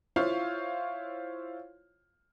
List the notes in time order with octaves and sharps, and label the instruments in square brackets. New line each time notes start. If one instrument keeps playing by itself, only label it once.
[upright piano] E4 F4 C5 C#5 F5